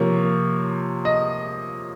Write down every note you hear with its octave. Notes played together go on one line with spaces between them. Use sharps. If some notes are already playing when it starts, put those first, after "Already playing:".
Already playing: C3 F3 A#3 C#5
D#5